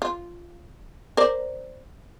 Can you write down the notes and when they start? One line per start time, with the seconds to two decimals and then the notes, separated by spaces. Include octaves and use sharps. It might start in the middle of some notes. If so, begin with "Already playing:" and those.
0.02 F4
1.17 A#4 C5 D5